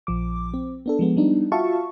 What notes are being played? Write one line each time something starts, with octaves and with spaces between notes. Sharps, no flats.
A#1 F3 D6
C4
B3 D4 A4
F3 G#3 B3
G3 B3 D4 D#4
F4 F#4 E5 F5 A5 C#6